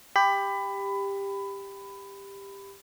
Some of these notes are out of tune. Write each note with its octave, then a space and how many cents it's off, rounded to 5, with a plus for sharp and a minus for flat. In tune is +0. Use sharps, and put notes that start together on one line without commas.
G4 +15 B5 +20